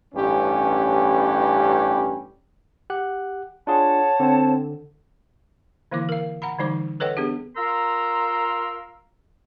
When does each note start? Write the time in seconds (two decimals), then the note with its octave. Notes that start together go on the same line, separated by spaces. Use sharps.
0.15 A1 G2 C#4 G4
2.90 G4 F#5 F#6
3.67 D4 F4 G#4 C#5 F#5 A5
4.20 D3 C4
5.91 D3 E3 A#3 E4 D6
6.09 A#4 F5
6.42 F#5 A#5 B5
6.59 D3 E3 G3 D#4 C5 D6
7.00 A4 B4 C#5 D#5 F#5 G5
7.17 B3 D4 G4 G#4
7.55 F4 A#4 A#5 C6 E6